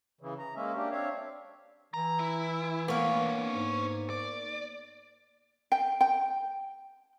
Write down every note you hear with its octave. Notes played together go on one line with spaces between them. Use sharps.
C#3 E3
A#5
G#3 A#3 C#4 E5
A#3 D4 G4
C4 D4 C#5 E5 F5
E3 A#5
E4
A#3 B3 D4 C#5
G#2
D5
G5
G5